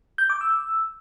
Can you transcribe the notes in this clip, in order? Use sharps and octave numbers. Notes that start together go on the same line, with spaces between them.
G6
D6
E6